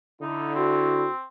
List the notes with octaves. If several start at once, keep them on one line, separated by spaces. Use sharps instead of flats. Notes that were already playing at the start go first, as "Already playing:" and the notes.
D3 D#4 E4
C4 F#4